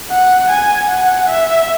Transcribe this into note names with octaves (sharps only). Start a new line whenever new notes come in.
F#5
G#5
F#5
E5